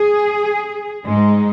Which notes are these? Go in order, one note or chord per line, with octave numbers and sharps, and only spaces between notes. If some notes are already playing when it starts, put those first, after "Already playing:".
Already playing: G#4
G#2 G#3 D#4